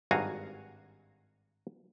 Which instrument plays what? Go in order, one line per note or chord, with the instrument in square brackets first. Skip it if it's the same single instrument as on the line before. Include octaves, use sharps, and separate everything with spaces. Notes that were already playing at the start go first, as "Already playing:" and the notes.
[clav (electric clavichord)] G#1 G2 F#4 F5 G#5 A#5